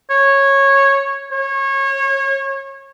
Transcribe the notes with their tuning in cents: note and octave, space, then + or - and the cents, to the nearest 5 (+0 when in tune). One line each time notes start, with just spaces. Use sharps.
C#5 -10
C#5 -25